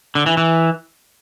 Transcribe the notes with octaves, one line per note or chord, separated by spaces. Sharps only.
D3
E3
E3